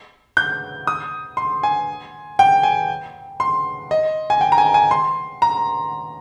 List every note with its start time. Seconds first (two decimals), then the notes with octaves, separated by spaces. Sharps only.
0.37 G6
0.87 D#6
1.37 C6
1.63 G#5
2.39 G5
2.63 G#5
3.40 C6
3.91 D#5
4.30 G#5
4.41 G5
4.52 A#5
4.58 G#5
4.74 G#5
4.91 C6
5.42 A#5